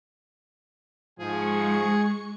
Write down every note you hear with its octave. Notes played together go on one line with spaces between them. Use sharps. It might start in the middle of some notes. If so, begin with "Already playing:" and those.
G#2 F3 G#3 G#4 C#6 C#7